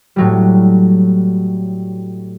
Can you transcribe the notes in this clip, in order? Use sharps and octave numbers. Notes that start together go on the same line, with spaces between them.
A2 F#3 G3